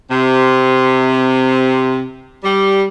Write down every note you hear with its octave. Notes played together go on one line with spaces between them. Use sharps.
C3
G3